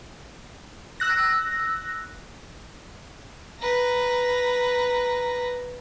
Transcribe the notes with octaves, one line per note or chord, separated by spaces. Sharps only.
E6 F#6 A#6
B4 A#5